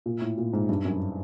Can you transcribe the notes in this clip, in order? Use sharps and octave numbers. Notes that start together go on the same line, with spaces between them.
A#2
A2
A#2
G#2
G2
F#2